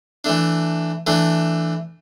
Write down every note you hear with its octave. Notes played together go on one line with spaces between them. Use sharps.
E3 A3 D4
E3 A3 D4